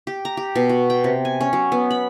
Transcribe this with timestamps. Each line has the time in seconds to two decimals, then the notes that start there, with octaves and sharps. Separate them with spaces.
0.07 G4
0.25 A#5
0.37 G4
0.55 B2
0.69 F#4
0.90 G5
1.04 C3
1.25 G#5
1.41 C#4
1.53 F#3
1.72 B3
1.91 B5